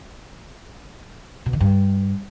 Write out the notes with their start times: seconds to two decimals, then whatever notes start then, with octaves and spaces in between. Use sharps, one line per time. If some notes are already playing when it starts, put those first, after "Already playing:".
1.46 B2
1.53 D#3
1.60 G2